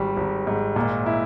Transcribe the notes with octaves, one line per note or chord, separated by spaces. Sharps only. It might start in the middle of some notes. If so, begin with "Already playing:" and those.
Already playing: G#1 G3
G#1
G#2
A#2
E4